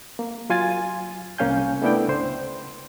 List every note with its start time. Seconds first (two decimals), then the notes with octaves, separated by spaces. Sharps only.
0.19 A#3
0.50 F#3 F4 G#5 G#6 A6
1.38 C2 A#3 C#4 F5 G#5 G6
1.82 A3 B3 D4 E4 D5 G5
2.08 C#2 C5